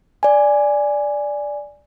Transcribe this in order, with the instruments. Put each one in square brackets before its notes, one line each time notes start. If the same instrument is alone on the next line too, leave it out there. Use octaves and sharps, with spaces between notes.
[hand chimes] D5 G#5